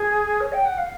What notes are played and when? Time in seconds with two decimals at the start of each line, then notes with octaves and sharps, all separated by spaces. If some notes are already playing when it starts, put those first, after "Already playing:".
Already playing: G#4
0.40 C#5
0.52 G5
0.65 F#5
0.77 F5